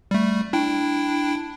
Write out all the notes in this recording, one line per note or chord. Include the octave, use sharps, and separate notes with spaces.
G3 A3
D4 E4 G5